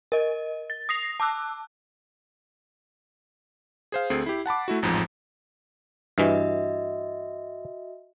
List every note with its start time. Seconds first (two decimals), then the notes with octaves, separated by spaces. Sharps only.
0.12 A#4 D#5
0.70 A6
0.89 D#6 A#6 C7 F7
1.20 A5 D6 E6 F#6
3.92 G#4 C5 F5
4.10 D2 C4 G#4 A4 C7
4.26 E4 G4
4.46 F#5 A5 B5 D6
4.68 A3 E4 F#4
4.83 A1 F2 G#2 F3
6.18 G2 E3 F#4 D#5 E5